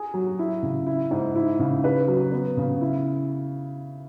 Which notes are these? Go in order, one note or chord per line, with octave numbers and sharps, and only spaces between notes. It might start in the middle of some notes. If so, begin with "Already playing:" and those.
Already playing: G#4
F#3
E4
C#3
E4
G#2
E4
C#3
B4
F#3
B3
C#3
E4